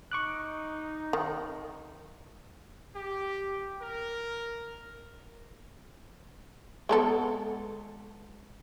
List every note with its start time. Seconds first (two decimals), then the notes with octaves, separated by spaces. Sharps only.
0.12 D#4 C#6 D6 F#6
1.13 D#3
2.96 G4
3.81 A#4
6.89 G#3 B3 A4